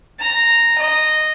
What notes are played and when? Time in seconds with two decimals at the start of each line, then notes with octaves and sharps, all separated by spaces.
0.19 A#5
0.79 D#5